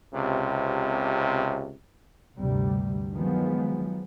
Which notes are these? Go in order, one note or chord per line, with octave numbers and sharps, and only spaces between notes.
C#2 C3
D2 G2 C3 G3
D#3 F3 F#3 G#3 B3